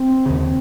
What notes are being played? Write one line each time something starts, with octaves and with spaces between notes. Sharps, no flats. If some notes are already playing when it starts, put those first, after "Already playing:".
Already playing: C4
D#2 C#3